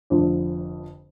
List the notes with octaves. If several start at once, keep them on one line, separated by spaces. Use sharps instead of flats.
F1 F2 D3